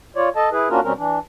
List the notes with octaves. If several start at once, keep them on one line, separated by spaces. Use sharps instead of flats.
F4 C#5 D5
A4 D#5 A5
E4 G#4 B4
A#3 C#4 D4 F4 F#4 A#4
B2 G3 C4 C#4 A#4
E3 D4